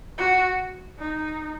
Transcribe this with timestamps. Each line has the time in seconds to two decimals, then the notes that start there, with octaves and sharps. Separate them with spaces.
0.18 F#4
0.99 D#4